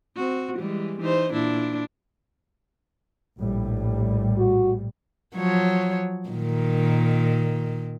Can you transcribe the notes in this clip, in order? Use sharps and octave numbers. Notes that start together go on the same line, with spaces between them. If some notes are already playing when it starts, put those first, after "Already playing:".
C4 F#4
E3 G3 G#3
E3 D#4 C5
A#2 D4 E4
A#1 A2 G3
F#4
F3 F#3 C#5
A#2 D#3